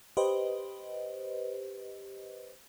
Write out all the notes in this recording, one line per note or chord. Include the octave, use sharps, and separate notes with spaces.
G4 B4 C5 D#5